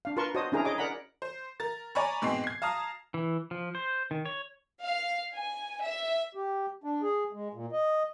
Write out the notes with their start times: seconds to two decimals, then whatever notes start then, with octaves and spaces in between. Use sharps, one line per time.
0.05 D4 F5
0.17 F4 A#4 B4 A5 C6 C#6
0.35 F#4 C5 C#5 D#5 A5 D#6
0.52 C#4 D4 E4 G#4 A#4 A#5
0.65 G#4 C#5 D#5 D6
0.78 A#4 D5 F#5 A#5 B5
1.22 C5
1.60 A#4 A6
1.95 C#5 D5 G#5 A#5 B5 C#6
2.22 G#2 B2 C4 C6 C7
2.44 G#6 C7
2.62 F5 A5 A#5 D#6 F6
3.14 E3
3.51 F3
3.75 C5
4.11 D#3
4.26 C#5
4.83 F5
5.35 G#5
5.82 E5
6.35 G4
6.84 D4
7.02 G#4
7.33 G#3
7.54 A#2
7.72 D#5